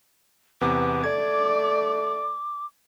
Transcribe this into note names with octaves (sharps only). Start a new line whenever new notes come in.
E2 C3 B3 D6
A3 D5 G#6